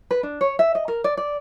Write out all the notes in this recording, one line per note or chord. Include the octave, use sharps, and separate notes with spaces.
B4
D4
C#5
E5
D#5
A#4
D5
D5